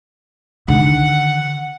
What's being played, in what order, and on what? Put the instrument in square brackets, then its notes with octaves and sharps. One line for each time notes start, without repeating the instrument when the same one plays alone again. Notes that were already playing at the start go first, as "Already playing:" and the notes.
[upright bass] D3 D#3 [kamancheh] F#5